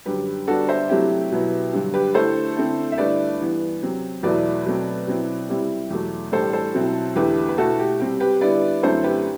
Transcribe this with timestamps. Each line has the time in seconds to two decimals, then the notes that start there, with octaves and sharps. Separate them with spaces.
0.06 F#2 D3 G3 G4 B4
0.47 D3 G3 B3 D4 F#4 A4
0.69 C5 E5
0.89 C3 F#3 A3 C4 E4 G4
1.31 B2 F#3 B3 E4
1.73 G2 D3 F#3
1.94 G4 B4
2.14 D3 A3 E4 A4 C5
2.56 D3 A3 C4 E4
2.92 E5
2.98 G2 D3 A3 E4 B4 D5
3.40 G2 E3 B3
3.82 C3 F#3 C4
4.23 E2 B2 F#3 A3 E4 B4 D5
4.65 B2 F#3 A3 C4
5.07 B2 F#3 C4 E4
5.49 C3 G3 C4 E4
5.90 E2 B2 F#3 A3
6.32 A2 E3 G3 D4 A4 C5
6.53 A4 C5
6.74 B2 F#3 C4 E4
7.16 E2 D3 A3 E4 G4 B4
7.48 B4
7.58 B2 A3 E4 F#4 A4
7.79 G4
8.00 C3 G3 C4 G4
8.20 G4 B4
8.41 D3 G3 B3 E4 B4 D5
8.83 F#2 D3 A3 C4 E4 A4 C5
9.04 G4 B4